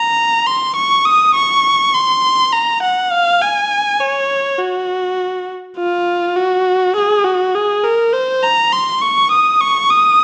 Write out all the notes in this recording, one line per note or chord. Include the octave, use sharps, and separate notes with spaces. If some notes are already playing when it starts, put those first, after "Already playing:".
Already playing: A#5
C6
C#6
D#6
C#6
C6
A#5
F#5
F5
G#5
C#5
F#4
F4
F#4
G#4
F#4
G#4
A#4
C5
A#5
C6
C#6
D#6
C#6
D#6